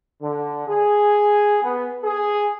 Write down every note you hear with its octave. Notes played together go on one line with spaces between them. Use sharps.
D3
G#4
B3
G#4